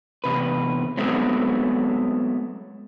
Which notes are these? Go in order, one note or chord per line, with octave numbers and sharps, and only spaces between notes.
E2 C3 B4
F#3 G#3 A3 B3 C4